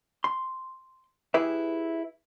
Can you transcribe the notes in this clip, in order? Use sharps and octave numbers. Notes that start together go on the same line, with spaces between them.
C6
E4 G4 G#4 B4 E5